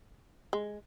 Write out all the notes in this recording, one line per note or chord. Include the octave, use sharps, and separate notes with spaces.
G#3